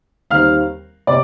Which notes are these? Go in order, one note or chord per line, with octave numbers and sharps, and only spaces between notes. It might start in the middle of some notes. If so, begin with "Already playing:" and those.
D#2 D#3 G3 C4 F5 F6
C3 D5 D6